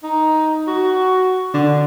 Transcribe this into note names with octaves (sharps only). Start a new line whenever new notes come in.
D#4
F#4
D3